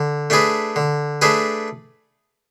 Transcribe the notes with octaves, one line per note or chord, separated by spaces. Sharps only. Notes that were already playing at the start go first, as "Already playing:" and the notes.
Already playing: D3
A3 D4 G#4 B4
D3
A3 D4 G#4 B4